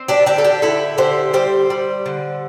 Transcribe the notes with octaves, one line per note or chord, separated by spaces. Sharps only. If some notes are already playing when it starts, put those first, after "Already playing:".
Already playing: C4
D4 G4
D3 D4 G4
A4
D4 G4
D3 E4 A4
D3 G4 C5
G3 G4 C5
G3
D3